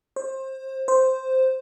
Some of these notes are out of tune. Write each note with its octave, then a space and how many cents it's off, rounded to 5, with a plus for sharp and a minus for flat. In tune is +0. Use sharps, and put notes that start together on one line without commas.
C5 +25
C5 -5